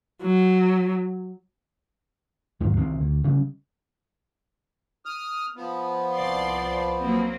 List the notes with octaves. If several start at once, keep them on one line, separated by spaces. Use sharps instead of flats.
F#3
E2 G#2 D#3 F#3
C2 C3 D#3 C4
D2
C#3 G3
D#6 F6
F3 B3
C2 D5 C6
F#3 A#3 C4